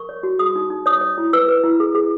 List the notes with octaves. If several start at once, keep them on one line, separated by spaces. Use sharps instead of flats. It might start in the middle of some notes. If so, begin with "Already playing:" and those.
Already playing: A#4 C#6
C#5
F#4
G#4 D#6
D#4
D#4
C#5 D#6
C#5
E4
B4 E6
B4
E4
G#4
G#4